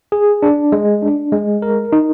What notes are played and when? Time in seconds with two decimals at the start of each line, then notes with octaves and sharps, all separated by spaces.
0.12 G#4
0.42 D4
0.72 G#3
1.02 D4
1.32 G#3
1.62 A#4
1.92 D#4